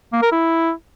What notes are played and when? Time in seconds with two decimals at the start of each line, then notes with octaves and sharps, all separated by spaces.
0.12 A#3
0.22 A#4
0.31 E4